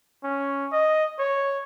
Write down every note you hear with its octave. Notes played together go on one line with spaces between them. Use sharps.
C#4
D#5
C#5